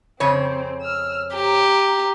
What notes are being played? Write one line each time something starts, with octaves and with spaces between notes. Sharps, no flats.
F2 C#3 C4 C#5
E6 F6
G4 A#5